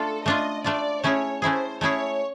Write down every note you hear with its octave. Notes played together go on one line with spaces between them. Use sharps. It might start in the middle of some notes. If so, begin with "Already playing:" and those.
Already playing: A3 D4 F4 A4
A3 D4 F4 D#5
A3 D4 F4 D5
A3 C#4 E4 G#4 C#5
A3 C#4 E4 G#4 C5
A3 C#4 E4 G#4 C#5